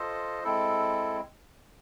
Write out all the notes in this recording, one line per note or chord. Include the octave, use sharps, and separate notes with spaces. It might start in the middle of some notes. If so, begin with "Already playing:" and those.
Already playing: F4 A4 C5 D#5
G#3 C4 E4 A4